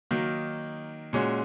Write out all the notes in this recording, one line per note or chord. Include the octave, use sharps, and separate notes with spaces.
D#3 F#3 A#3 D#4
A#2 G#3 C#4 F#4